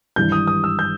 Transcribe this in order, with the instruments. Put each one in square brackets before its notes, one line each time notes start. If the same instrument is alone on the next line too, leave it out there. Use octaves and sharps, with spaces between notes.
[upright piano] G#1 G2 E3 G3 [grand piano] G6
[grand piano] D#6
D#6
E6
G6